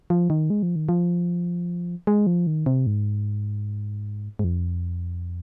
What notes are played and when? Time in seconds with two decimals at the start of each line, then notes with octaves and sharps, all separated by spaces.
0.10 F3
0.30 D#3
0.50 G#3
0.63 F3
0.76 D#3
0.89 F3
2.07 G#3
2.27 F3
2.47 D#3
2.66 C3
2.87 G#2
4.39 G#2
4.44 F2